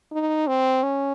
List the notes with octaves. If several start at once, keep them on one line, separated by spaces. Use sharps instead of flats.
D#4
C4
C#4